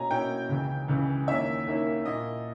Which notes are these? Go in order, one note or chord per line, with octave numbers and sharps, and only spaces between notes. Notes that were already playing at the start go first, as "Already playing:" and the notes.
Already playing: B2 A#3 C#4 E4 G#5 A#5
B2 A#3 C#4 E4 G5
C#2 C#3 E3
C#2 C#3 E3
D#2 D#3 A#3 C#4 E4 E5
D#2 D#3 A#3 C#4 E4
A#2 A#3 E4 D#5